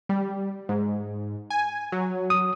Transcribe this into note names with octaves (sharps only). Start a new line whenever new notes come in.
G3
G#2
G#5
F#3
D#6